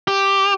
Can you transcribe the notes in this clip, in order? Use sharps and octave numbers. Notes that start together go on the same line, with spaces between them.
G4